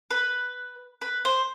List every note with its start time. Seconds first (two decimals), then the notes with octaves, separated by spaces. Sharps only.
0.11 B4
1.01 B4
1.25 C5